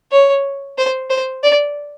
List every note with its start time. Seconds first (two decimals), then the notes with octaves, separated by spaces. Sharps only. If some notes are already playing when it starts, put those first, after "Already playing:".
0.12 C#5
0.78 C5
1.10 C5
1.44 D5